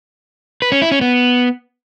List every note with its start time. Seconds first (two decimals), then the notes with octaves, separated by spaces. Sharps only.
0.62 B4
0.72 C#4
0.82 E4
0.92 C#4
1.01 B3